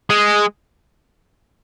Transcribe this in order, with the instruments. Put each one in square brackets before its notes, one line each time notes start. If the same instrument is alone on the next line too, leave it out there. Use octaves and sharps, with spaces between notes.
[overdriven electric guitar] G#3